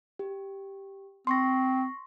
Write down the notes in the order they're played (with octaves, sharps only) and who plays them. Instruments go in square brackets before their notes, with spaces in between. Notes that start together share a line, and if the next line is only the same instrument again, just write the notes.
[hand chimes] G4
[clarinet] C4 [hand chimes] C6 C#6 A#6